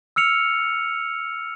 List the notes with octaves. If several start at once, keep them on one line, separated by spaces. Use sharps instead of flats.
E6 F6 C#7 F7